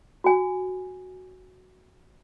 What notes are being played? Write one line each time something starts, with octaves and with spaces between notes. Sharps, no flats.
F#4 G#5